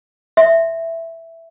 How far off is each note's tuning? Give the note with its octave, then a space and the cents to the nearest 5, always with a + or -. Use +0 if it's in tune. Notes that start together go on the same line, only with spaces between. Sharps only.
E5 +0 C6 -5